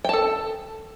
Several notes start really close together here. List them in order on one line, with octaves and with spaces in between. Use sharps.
G5 A5 A4